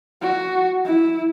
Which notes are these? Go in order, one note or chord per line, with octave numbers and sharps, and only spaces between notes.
F#4
E4